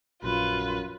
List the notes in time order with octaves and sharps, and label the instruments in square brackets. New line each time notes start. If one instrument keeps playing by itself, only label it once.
[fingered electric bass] A#1 [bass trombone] F#2 [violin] F4 [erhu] B4